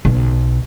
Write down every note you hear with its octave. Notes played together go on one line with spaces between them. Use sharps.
B1